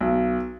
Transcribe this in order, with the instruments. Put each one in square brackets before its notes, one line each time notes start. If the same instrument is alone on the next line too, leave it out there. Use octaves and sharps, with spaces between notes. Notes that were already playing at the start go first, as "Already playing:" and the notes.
[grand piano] B1